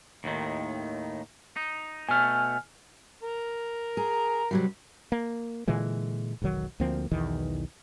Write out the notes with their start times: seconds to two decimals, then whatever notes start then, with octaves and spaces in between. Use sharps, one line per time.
0.24 D#2 A2 D#3
1.56 D#4
2.09 B2 A3 G#5 F6
3.23 A#4
3.97 G#4 A#5
4.51 C3 F#3 G3
5.12 A#3
5.68 A#2 D3 E3 G#3
6.42 E1 B1 D#3 F#3
6.80 D2 F3 A#3 C4
7.11 B1 E2 D#3 E3